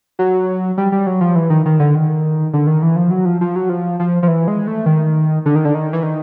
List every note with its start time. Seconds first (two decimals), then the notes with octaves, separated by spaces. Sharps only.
0.19 F#3
0.78 G3
0.92 G3
1.06 F#3
1.21 F3
1.36 E3
1.50 D#3
1.65 D#3
1.80 D3
1.95 D#3
2.53 D3
2.67 D#3
2.82 E3
2.96 F3
3.11 F#3
3.25 F3
3.41 F3
3.56 F#3
3.69 F3
3.99 F3
4.23 F3
4.28 E3
4.48 G#3
4.67 A3
4.86 D#3
5.46 D3
5.55 D#3
5.65 D3
5.74 D#3
5.93 E3
6.03 D#3